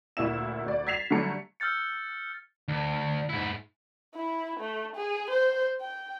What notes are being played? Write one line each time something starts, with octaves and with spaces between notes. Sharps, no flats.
D2 A#2 E4 E5 E7
D2 D5
G#6 A6 B6 C7 E7 F7
D3 F#3 G3 A3 A#5 C#7
E6 F6 G6 A6 C#7
D2
G#2 E4
E4
A3
G#4
C5
G5